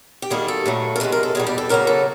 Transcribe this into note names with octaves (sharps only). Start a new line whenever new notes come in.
G4
F#2 D#3 G3 A#3 G#4
A4
A#2 F#3 A3
A#4
E2 C3 F3 G#3 B4
A#4
A4
E2 B2 G3 G#4
G4
A4
D2 C#3 F#3 A#3 A#4
A4